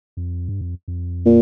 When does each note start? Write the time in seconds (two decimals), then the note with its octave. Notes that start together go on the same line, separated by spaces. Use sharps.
0.17 F2
0.49 G2
0.61 F2
0.88 F2
1.25 A#2